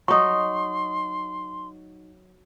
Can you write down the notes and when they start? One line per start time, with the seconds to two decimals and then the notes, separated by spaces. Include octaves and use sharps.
0.08 F#3 D#4 C6 C#6 D#6